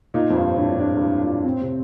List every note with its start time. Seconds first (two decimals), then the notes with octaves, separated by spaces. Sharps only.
0.14 A#2 D#4
0.30 F2
0.36 G2 C5
0.58 A2 D4
0.70 F2
0.79 G2 D4
0.96 G2
1.01 A2
1.23 A#2
1.44 A2 C4
1.61 C3